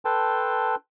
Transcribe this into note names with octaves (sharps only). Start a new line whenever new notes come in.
A4 B4 G5 A5 C6